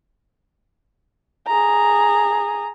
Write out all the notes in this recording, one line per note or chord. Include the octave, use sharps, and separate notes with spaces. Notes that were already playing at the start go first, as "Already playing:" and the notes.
G#4 A#5